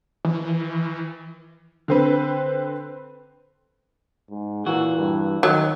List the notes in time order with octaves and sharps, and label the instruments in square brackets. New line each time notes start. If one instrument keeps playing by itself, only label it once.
[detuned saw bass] E3
[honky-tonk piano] D3 C4 B4
[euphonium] G#2
[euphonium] A#2 [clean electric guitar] E3 F#4
[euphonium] G2
[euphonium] D#3 [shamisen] F#3